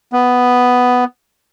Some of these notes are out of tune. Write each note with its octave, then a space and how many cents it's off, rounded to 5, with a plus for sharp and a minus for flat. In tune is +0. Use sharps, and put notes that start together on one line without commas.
B3 +5